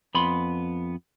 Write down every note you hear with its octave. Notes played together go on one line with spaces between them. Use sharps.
F2 B3 B5 C6